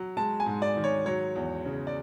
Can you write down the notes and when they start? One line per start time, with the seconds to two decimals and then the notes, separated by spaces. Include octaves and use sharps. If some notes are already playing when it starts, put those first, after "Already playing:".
Already playing: F#3
0.17 G#3 A5
0.40 G#5
0.46 G#2
0.62 D5
0.77 D#3
0.84 C#5
1.06 F#3 C#5
1.35 E2
1.66 C#3
1.87 D5